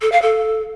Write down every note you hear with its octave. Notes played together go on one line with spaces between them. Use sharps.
A4
F5
A4